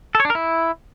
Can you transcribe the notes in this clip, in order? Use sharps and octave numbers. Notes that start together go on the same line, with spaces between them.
A4
C#5
D4
A#4
E4